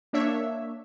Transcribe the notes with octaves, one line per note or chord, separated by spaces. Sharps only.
A#3 D4 C#5 E5